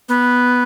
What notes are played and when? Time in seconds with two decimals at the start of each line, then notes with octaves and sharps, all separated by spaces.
0.08 B3